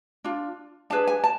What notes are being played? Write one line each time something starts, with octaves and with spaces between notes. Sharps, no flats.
D4 F4
D4 G#4 B4 A5
G#5
A5